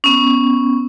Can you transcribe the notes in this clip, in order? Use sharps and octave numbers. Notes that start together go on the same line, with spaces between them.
B3 C#4